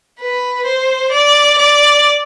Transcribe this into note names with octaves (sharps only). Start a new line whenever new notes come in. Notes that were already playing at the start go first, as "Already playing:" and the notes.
B4
C5
D5
D5